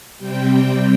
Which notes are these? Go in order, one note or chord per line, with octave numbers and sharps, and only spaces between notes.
C3 G3 C4 G5